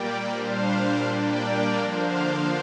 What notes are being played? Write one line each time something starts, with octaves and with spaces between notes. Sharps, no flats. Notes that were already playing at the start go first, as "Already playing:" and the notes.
Already playing: A#2 G3 A#3 D5 G5
A#2 G3 D4 C5 F5
A#2 G3 A#3 D4 D5 G5
A#4 D5
D3 F3 A#3 D4 C5 F5